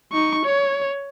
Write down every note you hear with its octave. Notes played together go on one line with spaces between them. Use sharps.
D#4 C#6
C#5